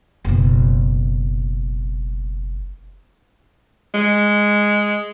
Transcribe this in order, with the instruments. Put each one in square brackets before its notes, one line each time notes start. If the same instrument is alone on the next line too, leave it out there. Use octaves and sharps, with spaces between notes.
[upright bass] F#1 B2
[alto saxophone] G#3